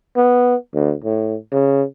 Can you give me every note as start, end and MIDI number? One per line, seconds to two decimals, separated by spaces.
0.16 0.55 59
0.74 0.94 38
1.04 1.35 45
1.52 1.83 49